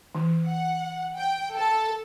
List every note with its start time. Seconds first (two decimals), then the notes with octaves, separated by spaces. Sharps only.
0.15 E3
0.47 F#5
1.17 G5
1.54 A4 A5